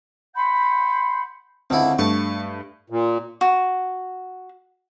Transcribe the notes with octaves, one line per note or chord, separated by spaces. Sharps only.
F#5 B5 C6 G6
C#2 D3 C4 E4
G2 A3 A5 C#6
A#2
F#4